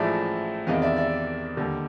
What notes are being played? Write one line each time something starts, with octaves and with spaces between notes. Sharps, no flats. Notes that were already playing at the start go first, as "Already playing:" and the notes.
Already playing: A1 A2 F3 G#3 D5 E5
E2 C3 D#3 D#5 F5
D5 E5
D5 E5
D#2 D3 G3